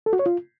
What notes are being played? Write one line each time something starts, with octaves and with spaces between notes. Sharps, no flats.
A4
F#4
C#5
F4